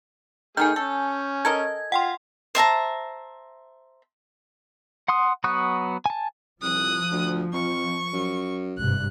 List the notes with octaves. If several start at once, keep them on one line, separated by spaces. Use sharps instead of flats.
D#3 A3 D#4 G#4 G#5 F6 G6
C#4 A4
A4 A#4 D#5 G#6
F4 F#5 G5 C6
C5 E5 A5 A#5
F#5 C6 D#6
F#3 B3 C#6 D#6 F#6
G#5 A5
C2 F3 D#6 F#6
D2
F2 C#6
F#2
G#1 G2 C3 F#6